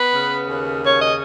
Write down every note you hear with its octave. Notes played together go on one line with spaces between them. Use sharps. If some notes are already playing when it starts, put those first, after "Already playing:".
Already playing: B3 B4
C#3
D#2
C#3 C#5
D#5